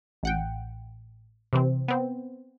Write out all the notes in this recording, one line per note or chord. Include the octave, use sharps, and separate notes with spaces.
A1 F#5 G5
C3 E3 C4
B3 C4